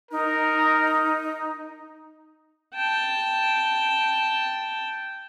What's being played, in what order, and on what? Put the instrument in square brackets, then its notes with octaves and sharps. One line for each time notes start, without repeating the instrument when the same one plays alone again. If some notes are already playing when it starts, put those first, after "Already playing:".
[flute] D#4 [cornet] A#4
[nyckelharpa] G5 A5